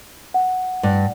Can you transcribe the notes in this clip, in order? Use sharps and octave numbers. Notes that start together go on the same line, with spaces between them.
F#5
G2